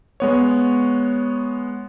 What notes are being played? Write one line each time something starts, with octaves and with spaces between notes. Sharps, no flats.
G#3 B3 C#5